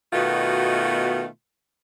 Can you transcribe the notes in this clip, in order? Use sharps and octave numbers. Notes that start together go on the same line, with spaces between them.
B2 D#3 A3 B3 F4 F#4